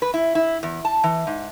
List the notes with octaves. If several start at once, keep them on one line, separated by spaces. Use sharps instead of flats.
B4
E4
E4
E2
A5
E3
G#2